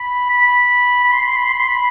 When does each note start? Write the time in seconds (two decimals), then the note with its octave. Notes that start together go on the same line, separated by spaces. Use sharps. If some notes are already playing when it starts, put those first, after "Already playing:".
Already playing: B5
0.30 B5
1.04 B5
1.12 C6
1.21 B5
1.28 C6
1.36 B5
1.45 C6
1.53 B5
1.59 C6
1.68 B5